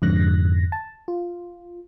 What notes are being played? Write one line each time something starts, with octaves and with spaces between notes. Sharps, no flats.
F2 G#2 D3 F#6 A#6
A5
F4